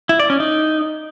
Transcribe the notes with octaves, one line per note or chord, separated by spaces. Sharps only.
E4
D5
C#4
D#4